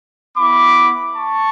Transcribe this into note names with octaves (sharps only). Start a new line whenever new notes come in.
B3 E4 B5 D6
A5 C#6